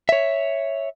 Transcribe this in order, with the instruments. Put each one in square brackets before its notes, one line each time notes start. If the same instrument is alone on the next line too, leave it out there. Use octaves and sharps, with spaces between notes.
[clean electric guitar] C#5 E5